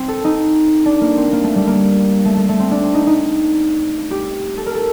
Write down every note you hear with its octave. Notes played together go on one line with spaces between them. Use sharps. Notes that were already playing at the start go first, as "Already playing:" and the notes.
Already playing: C4
A4
D#4
D4
A#3
C4
A#3
A3
G3
A#3
A3
A3
A3
C4
D4
C4
D#4
D#4
G4
A4
A#4
A4